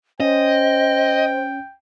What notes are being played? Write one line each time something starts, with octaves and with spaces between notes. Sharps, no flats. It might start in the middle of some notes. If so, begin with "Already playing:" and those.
C#4 C5 D#5 G5